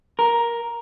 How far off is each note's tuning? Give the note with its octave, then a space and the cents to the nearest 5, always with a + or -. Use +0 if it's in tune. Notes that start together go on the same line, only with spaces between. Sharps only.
A#4 +10